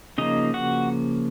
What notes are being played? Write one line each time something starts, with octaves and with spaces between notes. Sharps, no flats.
C#3 F3 A#3 D#4 D#5
F#4 F#5